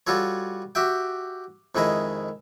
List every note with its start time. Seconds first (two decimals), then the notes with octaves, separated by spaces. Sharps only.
0.07 G3 F4 F#4 A4 C#5
0.75 F#4 G4 E5 G5
1.75 F2 D#3 G#3 E4 D#5